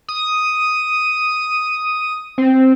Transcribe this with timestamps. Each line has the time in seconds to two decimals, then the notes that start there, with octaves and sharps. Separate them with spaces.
0.09 D#6
2.38 C4